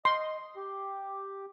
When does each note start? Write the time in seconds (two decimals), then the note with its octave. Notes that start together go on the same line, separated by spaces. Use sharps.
0.05 D#5 C6
0.56 G4